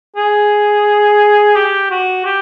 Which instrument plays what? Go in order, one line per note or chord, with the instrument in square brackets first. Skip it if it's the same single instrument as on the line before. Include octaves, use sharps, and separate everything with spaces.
[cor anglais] G#4
G4
F#4
G4